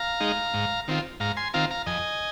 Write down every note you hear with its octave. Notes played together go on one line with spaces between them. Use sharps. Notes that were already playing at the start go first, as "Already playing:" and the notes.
Already playing: F5 A#5
G#3 D#4
G#2
D#3 C4 F4
G#2 F5 A#5
G#5 C6
D#3 C4 F4 F5 A#5
F5 A#5
F2 D#5 G#5